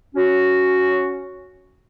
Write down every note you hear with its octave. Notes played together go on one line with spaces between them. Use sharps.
C#4 F#4